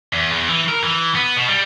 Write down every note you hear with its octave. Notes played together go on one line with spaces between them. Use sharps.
E2
E2
E3
A#4
E3
B3
B2
G3